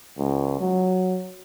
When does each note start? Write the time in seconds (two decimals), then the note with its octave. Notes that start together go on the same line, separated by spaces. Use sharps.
0.18 C#2
0.61 F#3